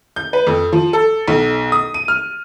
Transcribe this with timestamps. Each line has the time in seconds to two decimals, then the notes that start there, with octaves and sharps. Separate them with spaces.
0.16 G6
0.33 B4
0.47 F2
0.73 F3
0.93 A4
1.28 B1
1.72 D#6
1.94 D#7
2.08 F6